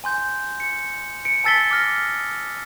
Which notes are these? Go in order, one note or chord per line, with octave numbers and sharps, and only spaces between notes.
G#5 C6 G6
C#7
C#7 D7
G#5 A5 E6 A6 B6 G7
D6 F6 A#6
D#6